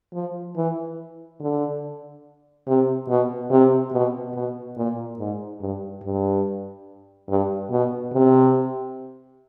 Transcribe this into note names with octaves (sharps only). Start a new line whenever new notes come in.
F3
E3
D3
C3
B2
C3
B2
B2
A#2
G#2
G2
G2
G2
B2
C3